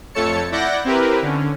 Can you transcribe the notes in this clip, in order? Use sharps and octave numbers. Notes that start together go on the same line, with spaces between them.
F2 A3 A4 C#5 A5 C#7
E4 D5 F#5 G6 A#6
C4 E4 G4 A#4 B4
D3 C#4